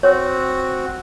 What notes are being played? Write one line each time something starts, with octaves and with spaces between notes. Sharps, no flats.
C4 F#4 C#5